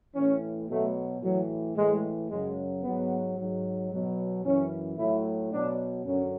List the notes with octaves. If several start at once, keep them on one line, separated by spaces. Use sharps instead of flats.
A2 E3 C#4
B2 F#3 A3
A2 E3 F#3
A2 E3 G#3
F#2 C#3 F#3 G#3
G#2 F#3 B3
G#2 F#3
B2 F#3
F#2 E3 C#4
A2 F#3 E4
B2 F#3 D4
F#2 D3 F#3 C#4